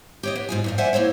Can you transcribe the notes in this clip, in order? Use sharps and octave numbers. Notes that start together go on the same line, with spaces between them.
G4 C#5 D#5
B3
G#2 F4 G#5
G2 A#2 F3
C5 D5 E5 F#5 G#5
A#3 C4 E4 C5 C#5